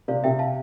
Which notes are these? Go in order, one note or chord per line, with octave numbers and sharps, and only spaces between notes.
C3 D5 F5
C3 E5 G5
F5 A5